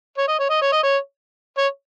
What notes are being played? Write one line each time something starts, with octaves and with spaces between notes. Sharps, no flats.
C#5
D#5
C#5
D#5
C#5
D#5
C#5
C#5